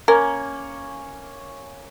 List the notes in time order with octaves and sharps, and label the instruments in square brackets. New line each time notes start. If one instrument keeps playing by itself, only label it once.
[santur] A#3 C#4 [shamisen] A#4